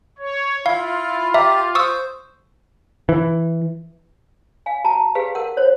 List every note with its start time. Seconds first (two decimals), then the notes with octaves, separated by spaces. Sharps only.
0.18 C#5
0.66 E4 F4 F5
1.34 G4 E5 A#5
1.75 C5 C#6 D#6 E6
3.09 E3
4.66 F5 G#5
4.84 F#4 A5 A#5
5.15 G4 G#4 B4 F5
5.35 A#4 F#5
5.57 C5 C#5